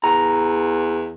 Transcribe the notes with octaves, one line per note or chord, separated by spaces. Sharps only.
E2 A#5